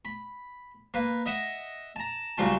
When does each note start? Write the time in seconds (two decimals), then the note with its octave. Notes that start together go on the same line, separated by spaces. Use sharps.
0.05 B5
0.94 A#3 B4
1.26 D#5 E5 F#5
1.96 A5 A#5
2.38 C2 C#3 F#3 G3 F4 A5